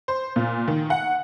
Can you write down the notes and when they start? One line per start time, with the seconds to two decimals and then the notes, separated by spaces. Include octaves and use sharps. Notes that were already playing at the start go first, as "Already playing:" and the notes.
0.08 C5
0.36 A#2
0.68 D#3
0.90 F#5